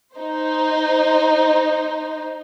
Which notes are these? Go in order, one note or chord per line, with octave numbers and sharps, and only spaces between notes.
D#4 C5